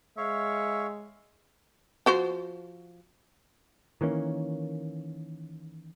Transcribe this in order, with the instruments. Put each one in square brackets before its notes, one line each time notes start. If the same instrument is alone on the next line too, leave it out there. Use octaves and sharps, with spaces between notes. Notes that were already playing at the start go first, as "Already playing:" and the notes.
[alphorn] G#3 [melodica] C#5 F5 C#6 [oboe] E5
[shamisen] F3 F#4 C5
[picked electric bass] D#3 E3 A#3 C#4